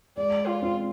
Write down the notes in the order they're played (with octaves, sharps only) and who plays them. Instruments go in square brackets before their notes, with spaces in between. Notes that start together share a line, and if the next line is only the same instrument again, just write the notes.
[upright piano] G#3 [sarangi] D5
[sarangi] F4
[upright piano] C4